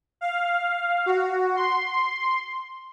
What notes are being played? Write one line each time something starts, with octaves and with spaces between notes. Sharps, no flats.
F5
F#4
C6